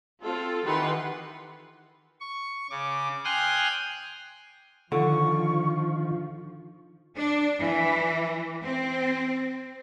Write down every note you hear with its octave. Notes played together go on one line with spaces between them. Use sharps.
C4 F4 A4
D#3 E3 G4 B4 F#5 C6
C#6
C#3 D6
G5 G#5 C6 D#6 F6 F#6
D3 D#3 F3 F4 C#6
D4
E3
C4